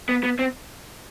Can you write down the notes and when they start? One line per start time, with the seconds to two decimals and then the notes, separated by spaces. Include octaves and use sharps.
0.09 B3
0.23 B3
0.39 C4